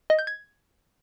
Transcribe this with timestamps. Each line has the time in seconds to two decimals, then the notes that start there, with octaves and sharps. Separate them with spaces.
0.10 D#5
0.19 G6
0.27 G#6